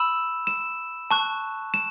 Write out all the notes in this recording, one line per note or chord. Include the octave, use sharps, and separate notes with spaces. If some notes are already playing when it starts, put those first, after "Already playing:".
Already playing: B5 E6 E7
E7
A5 C#6 F#6
E7